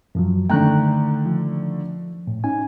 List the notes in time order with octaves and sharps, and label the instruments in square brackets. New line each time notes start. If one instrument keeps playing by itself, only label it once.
[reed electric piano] F#2 F3 F#3
[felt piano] D3 D#3 A3 [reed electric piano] G5 A#5 F#6
[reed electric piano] F3
A2
C#4 D#4 G#5